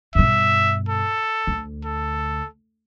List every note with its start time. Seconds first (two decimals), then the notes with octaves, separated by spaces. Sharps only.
0.15 G2 B2 E5
0.89 A4
1.47 D2
1.85 A4